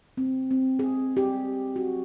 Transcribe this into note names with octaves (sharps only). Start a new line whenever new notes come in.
C4
C4
G#4
G4
F#4